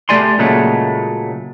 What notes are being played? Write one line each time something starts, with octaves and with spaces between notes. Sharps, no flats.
A3 G4 D5 G#5 C6
A#2 C#3 F#3 G#3 A3